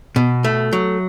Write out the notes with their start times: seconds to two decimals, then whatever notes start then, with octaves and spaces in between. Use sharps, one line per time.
0.16 B2
0.44 A3
0.73 F#3